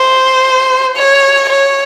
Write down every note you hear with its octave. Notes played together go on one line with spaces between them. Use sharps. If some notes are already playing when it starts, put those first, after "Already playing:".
Already playing: C5
C#5
C#5